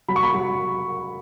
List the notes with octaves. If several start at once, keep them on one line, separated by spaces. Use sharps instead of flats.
F#3 B5
C#6
B5
F#3